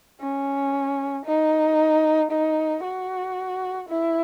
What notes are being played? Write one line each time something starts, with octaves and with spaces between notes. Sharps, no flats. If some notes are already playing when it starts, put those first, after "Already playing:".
C#4
D#4
D#4
F#4
E4